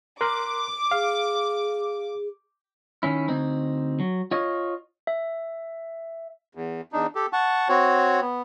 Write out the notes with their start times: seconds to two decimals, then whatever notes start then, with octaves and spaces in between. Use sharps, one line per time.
0.21 A#4 C6 D6 F#6
0.91 G#4 F5
3.03 D#3 C#4 E4
3.28 D2 C4 D#4
4.00 F#3
4.31 F4 C#5 D#5
5.07 E5
6.55 E2
6.93 E2 D4 D#4
7.15 G4 A4
7.33 F#5 A5 C#6
7.69 C4 F#4 C#5
8.21 B3